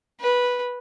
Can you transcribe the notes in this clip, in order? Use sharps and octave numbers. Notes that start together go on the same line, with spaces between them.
B4